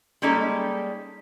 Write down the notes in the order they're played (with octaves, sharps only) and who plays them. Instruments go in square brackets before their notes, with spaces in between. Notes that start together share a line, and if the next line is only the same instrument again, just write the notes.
[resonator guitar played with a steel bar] G3 G#3 A#3 C#4 D#4 A4